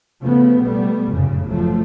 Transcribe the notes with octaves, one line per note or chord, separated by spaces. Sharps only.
C#3 F3 A3 B3
B2 G3 A3 B3
F1 F#2 A2 C#3
F#1 F3 F#3 A3